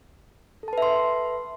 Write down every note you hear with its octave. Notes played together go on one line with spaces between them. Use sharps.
A4 B4 E5 A5 C6